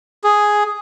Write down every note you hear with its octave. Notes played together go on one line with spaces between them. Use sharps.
G#4